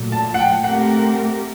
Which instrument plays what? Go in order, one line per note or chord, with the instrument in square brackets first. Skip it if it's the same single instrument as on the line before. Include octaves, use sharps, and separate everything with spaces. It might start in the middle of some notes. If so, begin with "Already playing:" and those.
Already playing: [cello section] A#2 F#3 A3
[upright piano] A5
F#5
G5
[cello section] A3 C4 G4 A#4 [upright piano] F#5